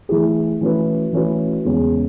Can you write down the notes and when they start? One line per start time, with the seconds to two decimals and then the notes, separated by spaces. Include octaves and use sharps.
0.09 E3 A3 E4 G#4
0.61 E3 A3 C#4 F#4 B4
1.13 E3 A3 C#4 F#4 B4
1.65 E2 C#3 G#3 C#4